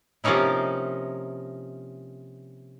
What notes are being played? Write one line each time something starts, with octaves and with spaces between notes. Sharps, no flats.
C3 F3 A#3 C#4 D#4 E4